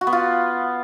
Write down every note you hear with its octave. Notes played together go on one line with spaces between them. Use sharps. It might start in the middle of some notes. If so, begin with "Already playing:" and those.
F#4
B3
F4